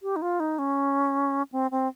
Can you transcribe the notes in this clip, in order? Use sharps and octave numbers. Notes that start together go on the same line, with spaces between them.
G4
D#4
F4
D#4
C#4
C4
C4